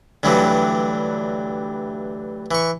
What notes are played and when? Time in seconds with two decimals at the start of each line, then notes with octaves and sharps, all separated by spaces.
0.23 D2 G2 E3 F#3 G3
2.51 E3 C#6